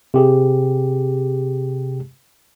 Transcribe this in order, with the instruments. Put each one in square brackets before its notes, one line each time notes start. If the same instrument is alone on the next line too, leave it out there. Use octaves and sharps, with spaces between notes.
[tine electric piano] C3 G4 G#4